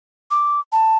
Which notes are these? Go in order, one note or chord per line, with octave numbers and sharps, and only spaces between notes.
D6
A5